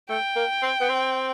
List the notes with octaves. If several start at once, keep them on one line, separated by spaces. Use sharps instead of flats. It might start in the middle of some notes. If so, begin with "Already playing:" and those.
A3 G5
A#3
C4
B3
C4